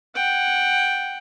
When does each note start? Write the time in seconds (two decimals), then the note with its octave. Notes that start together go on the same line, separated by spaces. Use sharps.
0.16 F#5 G5